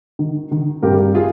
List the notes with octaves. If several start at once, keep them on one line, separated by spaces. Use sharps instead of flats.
D#3
D#3
G2 G4 A#4
F4 G#4